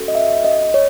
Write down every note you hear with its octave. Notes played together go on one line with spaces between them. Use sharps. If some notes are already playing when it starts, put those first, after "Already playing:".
Already playing: C#4 F#4 A4
D#5
E5
D#5
C#5